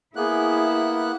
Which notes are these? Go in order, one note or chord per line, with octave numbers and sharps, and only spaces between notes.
A#3 B3 E4 G#4 F#6